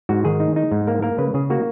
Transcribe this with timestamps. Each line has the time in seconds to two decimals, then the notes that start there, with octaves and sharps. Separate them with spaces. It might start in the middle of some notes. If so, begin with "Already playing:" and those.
0.09 G#2 F#4
0.25 D#3 G#4
0.40 D#4
0.56 D#4
0.72 G#2
0.87 A#3 A#4
1.02 A#3 A#4
1.18 C#3 B4
1.34 C#3 G#4
1.50 A#3 F#4